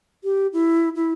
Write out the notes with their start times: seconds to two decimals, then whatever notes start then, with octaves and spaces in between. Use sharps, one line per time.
0.24 G4
0.53 E4
0.95 E4